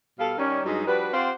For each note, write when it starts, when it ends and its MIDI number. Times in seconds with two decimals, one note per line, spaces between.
0.19 0.37 47
0.19 0.37 55
0.19 0.37 69
0.19 0.37 77
0.38 0.61 51
0.38 0.61 55
0.38 0.61 61
0.65 0.84 43
0.65 0.84 54
0.65 0.84 56
0.65 0.84 63
0.87 1.09 53
0.87 1.09 55
0.87 1.09 62
0.87 1.09 66
0.87 1.09 71
1.13 1.31 60
1.13 1.31 65
1.13 1.31 67
1.13 1.31 72
1.13 1.31 77
1.13 1.31 78